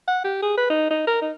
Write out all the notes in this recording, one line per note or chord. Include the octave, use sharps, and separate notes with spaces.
F#5
G4
G#4
B4
D#4
D#4
A#4
D#4